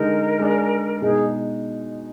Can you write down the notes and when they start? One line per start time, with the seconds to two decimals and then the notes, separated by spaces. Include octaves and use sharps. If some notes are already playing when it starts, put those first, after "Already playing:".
Already playing: D3 G#3 D#4 A#4
0.39 G#3 D4 G#4 D5
1.01 B2 G#3 D#4 G#4